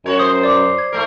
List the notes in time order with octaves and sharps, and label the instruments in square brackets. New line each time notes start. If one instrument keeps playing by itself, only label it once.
[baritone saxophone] F#2 [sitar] F#4 C#5
[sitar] C5 [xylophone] D#6
[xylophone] D5 D6
G#6
[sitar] G#2 A3 A#4